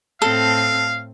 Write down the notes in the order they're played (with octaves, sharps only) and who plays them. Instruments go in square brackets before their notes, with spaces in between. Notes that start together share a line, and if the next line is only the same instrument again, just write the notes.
[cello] A2 C4 [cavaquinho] A4 [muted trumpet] F5